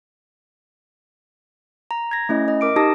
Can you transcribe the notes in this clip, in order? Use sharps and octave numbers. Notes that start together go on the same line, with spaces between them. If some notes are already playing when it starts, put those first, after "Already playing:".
A#5
G#6 A#6
A3 C#4 E4 D#5
D#5
A#4 D6 D7
D#4 G4 A5 D#6 A#6